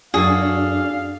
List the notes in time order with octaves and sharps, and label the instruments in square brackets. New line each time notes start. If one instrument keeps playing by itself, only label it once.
[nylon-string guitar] F#2 F#4 [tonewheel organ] D4 [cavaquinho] G#4 A4 [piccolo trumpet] F5